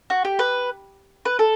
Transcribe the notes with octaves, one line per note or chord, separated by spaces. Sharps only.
F#4
G4
B4
B4
A4